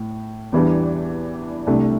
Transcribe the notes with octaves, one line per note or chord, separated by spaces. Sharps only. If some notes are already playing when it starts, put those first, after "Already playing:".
Already playing: A2
E2 E3 G3 D4
C2 C3 A3 D4